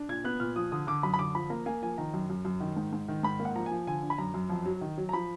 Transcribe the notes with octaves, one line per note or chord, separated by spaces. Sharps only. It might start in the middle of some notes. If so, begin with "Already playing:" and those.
Already playing: D4
A#2 G#6
B3 F#6
A#2 F6
F3 D#6
D3 D#6
D3 D6
F#2 B5
B5
D3 D6
F3 B5
A#3 A#5
A#3 G#5
F3 G#5
D#3 A#5
F#2
F#2
F#2
D#3
G#2
G#2
D#3
G#2 B5
A#3
F#5
F3 A#5
G#5
F3
D3 G#5
D4
B5
F#2 A#5
F#2
F2
F#3
D#3
F#3
A#5
F3 B5